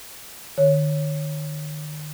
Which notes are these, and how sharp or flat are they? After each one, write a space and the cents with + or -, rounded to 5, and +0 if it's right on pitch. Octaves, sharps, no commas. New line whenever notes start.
D#3 -45 C#5 +0